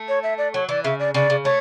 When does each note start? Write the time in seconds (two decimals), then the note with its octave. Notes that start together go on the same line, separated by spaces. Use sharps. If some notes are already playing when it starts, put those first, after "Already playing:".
Already playing: A3
0.09 C#5
0.23 E5
0.38 D5
0.54 F#3 C#5
0.69 E3 D5
0.84 C#3 E5
1.00 D5
1.14 C#3 D5
1.30 C#3
1.45 A3 C#5